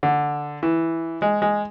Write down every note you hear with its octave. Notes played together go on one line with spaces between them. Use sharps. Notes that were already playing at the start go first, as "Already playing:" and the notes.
D3
E3
G#3
G#3